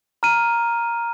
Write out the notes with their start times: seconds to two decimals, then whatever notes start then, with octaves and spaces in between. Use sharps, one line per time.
0.23 A#5 F6 D#7